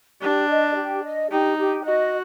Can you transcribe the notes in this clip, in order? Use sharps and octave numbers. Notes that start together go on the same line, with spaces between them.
D4 G4
D#5
G4
D#5
D#4 G4
G4
F#4 D#5